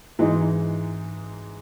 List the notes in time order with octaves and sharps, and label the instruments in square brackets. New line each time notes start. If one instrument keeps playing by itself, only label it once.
[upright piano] G#2 E3 G#3 D#4